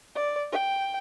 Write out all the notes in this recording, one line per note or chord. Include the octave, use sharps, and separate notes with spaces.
D5
G5